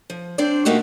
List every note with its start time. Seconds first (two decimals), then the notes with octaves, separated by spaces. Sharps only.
0.10 F3
0.38 C4 D4 C5 D5
0.65 B2 A3 A#3 D#4 F#4 G4